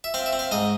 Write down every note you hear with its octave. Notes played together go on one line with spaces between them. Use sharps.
E5
C4 F5
E5
C4
F5
G#2 D#5